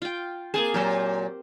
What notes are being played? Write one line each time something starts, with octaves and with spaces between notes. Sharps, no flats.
F4 G5
A#3 C4 G#4 A5
A#2 F#3 G4 C5